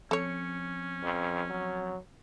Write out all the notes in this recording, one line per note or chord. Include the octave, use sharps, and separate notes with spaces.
F3 C4 C#4 A4 C#5 C#7
F2
F#3